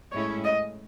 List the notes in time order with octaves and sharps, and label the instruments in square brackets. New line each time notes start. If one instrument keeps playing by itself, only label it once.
[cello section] A2 G#3 C#4 E4 [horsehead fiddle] C#5
[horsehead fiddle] D#5